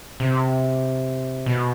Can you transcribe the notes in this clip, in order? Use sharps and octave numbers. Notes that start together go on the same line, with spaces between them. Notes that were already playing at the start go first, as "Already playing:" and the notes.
C3
B2